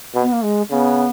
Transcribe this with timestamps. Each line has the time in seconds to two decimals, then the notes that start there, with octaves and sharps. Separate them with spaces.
0.14 B2
0.21 B3
0.32 A#3
0.42 G#3
0.71 C#3 B3